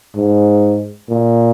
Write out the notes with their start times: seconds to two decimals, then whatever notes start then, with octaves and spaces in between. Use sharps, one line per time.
0.16 G#2
1.09 A#2